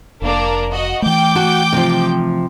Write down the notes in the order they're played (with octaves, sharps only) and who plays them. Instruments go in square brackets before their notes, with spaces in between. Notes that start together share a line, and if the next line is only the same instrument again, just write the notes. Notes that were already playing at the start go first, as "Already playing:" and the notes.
[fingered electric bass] F1 [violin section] A#3 D4 A#4
[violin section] F#4 D#5
[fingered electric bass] E3 A3 [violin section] G5 D6 G6
[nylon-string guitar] F#4 A5
C3 F3